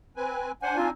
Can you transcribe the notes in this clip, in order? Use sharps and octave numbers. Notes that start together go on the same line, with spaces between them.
C4 B4 G#5
D4 C5 F#5 G#5
C4 D#4 F4